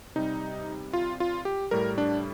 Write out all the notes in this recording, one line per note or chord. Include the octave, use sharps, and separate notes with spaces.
C3 G3 D#4
F4
F4
G4
A2 G3 A#4
D4